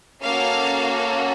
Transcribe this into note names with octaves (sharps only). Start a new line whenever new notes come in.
A#3 C#4 F#4 A4 F5